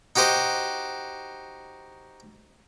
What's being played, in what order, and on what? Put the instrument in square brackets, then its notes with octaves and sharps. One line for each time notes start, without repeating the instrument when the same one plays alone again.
[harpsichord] D#4 F#4 G4 C5 D#5